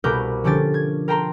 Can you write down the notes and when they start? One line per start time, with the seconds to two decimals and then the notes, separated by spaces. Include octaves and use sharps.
0.04 C2 B2 A#4 B4 D6 G6
0.44 D3 F3 C#4 D4 G4 A6
0.74 G#6
1.08 A#4 G5 A5 A#5 C6